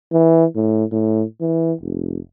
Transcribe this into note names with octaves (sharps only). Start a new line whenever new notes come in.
E3
A2
A2
E3
F1